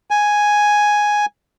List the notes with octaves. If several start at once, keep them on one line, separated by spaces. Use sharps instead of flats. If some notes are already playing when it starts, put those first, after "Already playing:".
G#5